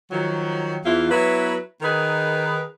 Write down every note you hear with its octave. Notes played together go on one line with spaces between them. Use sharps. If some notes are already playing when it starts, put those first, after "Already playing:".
D#3 F3 F#3
E2 E3 E4 F4
F#3 B3 E4 B4
D#3 D#4 G#4 A#4 B4